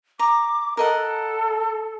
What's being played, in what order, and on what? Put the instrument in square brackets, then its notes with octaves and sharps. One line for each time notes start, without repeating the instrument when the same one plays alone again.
[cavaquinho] A#5 [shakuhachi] D6
[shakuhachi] A4 [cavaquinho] A#4 D#5 F#5